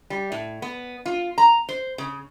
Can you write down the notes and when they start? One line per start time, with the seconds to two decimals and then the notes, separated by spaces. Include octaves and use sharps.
0.10 G3
0.32 A2
0.62 B3
1.06 F4
1.38 A#5
1.69 C5
1.98 C#3